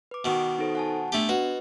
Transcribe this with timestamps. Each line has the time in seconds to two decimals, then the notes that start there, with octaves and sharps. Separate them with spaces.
0.11 B4 D6
0.25 B2 D#3
0.59 D#4 A4 C5
0.75 F#5 G#5 A5
1.12 A3 B3 D4 G4
1.29 F#4 B4 D#5